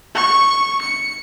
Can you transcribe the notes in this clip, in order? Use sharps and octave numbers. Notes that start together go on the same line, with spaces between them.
C#6
C#7